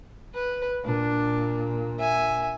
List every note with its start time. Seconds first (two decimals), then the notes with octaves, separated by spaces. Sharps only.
0.34 B4
0.85 A#2 D4
1.99 E5 G#5